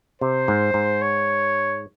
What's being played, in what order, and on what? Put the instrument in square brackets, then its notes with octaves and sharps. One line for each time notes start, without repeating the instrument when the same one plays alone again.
[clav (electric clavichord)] C3 [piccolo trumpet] C5
[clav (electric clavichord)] G#2
G#2
[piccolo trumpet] C#5